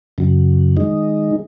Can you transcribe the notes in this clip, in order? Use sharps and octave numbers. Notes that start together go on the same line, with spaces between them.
F#2 C#3 F#3
D#3 G#3 D#4